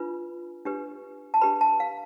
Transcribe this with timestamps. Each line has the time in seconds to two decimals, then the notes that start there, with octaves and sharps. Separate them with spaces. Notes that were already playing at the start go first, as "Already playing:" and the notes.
Already playing: D4 F4 B4 B5
0.65 D4 G4 B4
1.34 A5
1.41 D4 G4 B4 B5
1.61 A5
1.80 F5